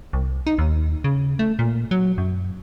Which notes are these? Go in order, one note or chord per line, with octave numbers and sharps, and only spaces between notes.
C2
D#4
D#2
C#3
A3
A#2
F#3
F#2